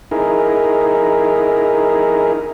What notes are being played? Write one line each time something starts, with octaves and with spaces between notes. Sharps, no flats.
D#4 E4 G#4 A#4